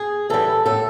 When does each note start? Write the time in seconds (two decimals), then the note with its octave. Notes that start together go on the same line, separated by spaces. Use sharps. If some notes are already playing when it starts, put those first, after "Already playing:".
Already playing: G#4
0.30 E3 G3 A4
0.66 A2 A4